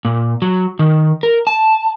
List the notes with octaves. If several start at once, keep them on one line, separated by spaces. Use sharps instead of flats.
A#2
F#3
D#3
A#4
A5